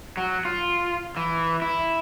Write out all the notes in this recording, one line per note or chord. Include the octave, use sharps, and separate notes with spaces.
F#3
F4
E3
E4